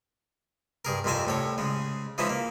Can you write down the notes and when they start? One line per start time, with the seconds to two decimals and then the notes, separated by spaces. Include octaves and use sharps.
0.85 G2 G#4 A#4
1.04 C2 F2 C3 C4 G#5 A5
1.25 C2 A2 A4 C#5
1.58 C#3 G#3
2.18 E3 F3 G#3 C#4 D#4 E4
2.29 A#3